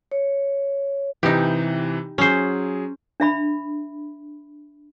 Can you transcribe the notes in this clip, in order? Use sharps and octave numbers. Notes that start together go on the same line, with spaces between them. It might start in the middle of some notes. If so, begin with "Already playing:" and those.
C#5
C3 E3 D#4 G4
F#3 C#4 G#4 C5
D4 E5 B5